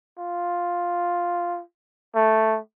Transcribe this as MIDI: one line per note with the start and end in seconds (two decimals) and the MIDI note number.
0.18 1.61 65
2.15 2.58 57